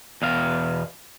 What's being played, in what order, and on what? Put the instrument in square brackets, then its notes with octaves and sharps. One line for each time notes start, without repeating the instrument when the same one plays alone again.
[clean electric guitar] E2 B2 F5